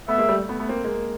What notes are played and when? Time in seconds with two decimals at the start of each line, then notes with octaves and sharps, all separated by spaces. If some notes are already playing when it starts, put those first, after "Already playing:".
0.08 A3 B3 E5
0.18 G#3 A#3
0.29 G3 A3
0.49 A3 B3
0.59 A3 B3
0.69 A#3 C4
0.84 G#3 A#3